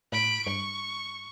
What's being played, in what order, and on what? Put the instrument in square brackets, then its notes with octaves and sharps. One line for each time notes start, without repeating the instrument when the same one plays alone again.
[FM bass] A2 [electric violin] B5 D7
[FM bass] G2 [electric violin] C#6